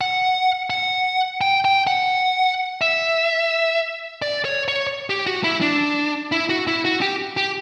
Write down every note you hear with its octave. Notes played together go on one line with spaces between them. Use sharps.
F#5
F#5
G5
G5
F#5
E5
D5
C#5
C#5
G4
F#4
E4
D4
E4
F#4
E4
F#4
G4
G4